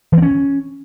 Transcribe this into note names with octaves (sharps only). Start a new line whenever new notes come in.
E3
C4
C#4